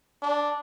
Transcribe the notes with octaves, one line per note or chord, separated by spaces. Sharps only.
D4